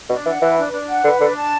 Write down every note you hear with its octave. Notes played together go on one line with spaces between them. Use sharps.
B2 D4
E3 F#5
E3 B4
D4
D4
F#5
D3 B4
D3 D4
A5